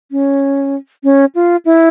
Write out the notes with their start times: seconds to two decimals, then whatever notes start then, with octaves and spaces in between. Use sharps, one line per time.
0.11 C#4
1.04 C#4
1.35 F4
1.65 E4